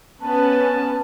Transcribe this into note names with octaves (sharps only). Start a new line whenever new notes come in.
B3 C#4 B4 A5